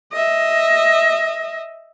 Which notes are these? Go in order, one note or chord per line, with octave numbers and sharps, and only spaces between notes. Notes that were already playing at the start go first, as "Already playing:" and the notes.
D#5 E5